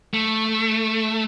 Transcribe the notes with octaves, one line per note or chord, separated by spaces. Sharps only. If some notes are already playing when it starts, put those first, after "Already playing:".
A3